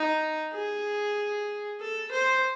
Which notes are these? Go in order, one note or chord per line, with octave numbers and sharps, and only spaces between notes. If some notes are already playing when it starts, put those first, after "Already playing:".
Already playing: D#4
G#4
A4
C5